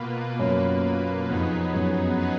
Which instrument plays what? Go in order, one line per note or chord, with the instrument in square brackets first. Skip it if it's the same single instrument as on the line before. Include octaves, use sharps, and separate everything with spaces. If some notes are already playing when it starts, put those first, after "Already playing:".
Already playing: [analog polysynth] B2 A#3 F4 B4
[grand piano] F#2 [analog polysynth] B2 A#3 F4 B4
[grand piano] F2 [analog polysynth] F#3 B3 D#4 G#4 B4
[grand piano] F#2
[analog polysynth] F#3 B3 D#4 G#4 B4